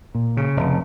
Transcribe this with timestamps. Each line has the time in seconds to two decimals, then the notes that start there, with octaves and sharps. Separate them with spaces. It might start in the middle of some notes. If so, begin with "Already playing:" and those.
0.15 A#2
0.37 C#3
0.57 F1